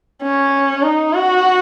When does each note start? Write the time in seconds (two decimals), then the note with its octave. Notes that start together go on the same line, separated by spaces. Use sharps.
0.22 C#4
0.83 D#4
1.13 F#4